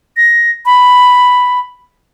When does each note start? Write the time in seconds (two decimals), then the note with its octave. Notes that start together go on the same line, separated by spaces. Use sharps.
0.17 A#6
0.66 B5